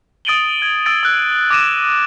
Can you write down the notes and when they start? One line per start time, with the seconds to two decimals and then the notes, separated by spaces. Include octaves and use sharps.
0.25 D#6 A6 D7 D#7 F#7 G7
0.62 G#6
0.86 E6 A6 D7
1.03 E6 F#6
1.50 D6 A#6 D#7 E7